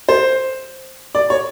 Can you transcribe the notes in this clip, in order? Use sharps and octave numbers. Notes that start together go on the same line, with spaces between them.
C5
D5
C#5